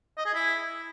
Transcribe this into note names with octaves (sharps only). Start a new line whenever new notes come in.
D#5
G#4
E4